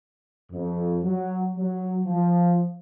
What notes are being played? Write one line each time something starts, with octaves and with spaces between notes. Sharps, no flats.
F2
F#3
F#3
F3